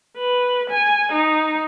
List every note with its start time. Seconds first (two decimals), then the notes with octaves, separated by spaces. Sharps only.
0.17 B4
0.70 G#5
1.12 D#4